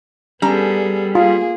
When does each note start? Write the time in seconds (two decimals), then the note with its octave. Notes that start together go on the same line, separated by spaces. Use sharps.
0.42 G3 B3 C#4 D4 G#4 A4 A#5
1.15 A#3 F4 G#4